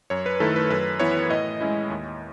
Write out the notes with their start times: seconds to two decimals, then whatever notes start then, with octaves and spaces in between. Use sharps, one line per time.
0.10 F#2 C#5
0.26 B4
0.40 D#3 A3 E4 A4
0.56 B4
0.70 F#2 B4
1.00 E3 B3 E4 C#5
1.29 A2 D#5
1.61 G#3 C#4 E4
1.90 D#2